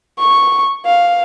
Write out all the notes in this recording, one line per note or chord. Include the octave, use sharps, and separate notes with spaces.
C#6
F5